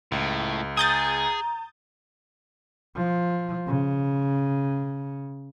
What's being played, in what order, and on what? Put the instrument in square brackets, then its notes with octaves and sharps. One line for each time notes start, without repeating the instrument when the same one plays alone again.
[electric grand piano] C#2 [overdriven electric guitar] A2
[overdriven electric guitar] G#4 [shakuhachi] A#5 [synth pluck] D#6 G6 A6
[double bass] F3
C#3